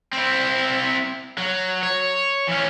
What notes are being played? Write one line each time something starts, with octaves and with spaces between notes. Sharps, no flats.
C4 E4
F#3
C#5
E3 C#4